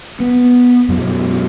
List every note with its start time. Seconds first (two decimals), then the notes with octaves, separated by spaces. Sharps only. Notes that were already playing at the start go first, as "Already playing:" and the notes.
0.20 B3
0.89 F#2 B2 G#3